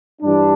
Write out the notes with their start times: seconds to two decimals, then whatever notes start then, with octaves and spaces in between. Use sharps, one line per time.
0.22 G2 E3 G3 D4